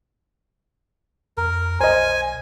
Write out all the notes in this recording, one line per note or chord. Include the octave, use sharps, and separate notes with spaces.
F2 A#4
B1 C5 D#5 G#5